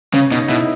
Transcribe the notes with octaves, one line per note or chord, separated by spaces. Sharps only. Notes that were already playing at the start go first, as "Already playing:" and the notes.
C#3 C#4
B2 D#4
B2 E4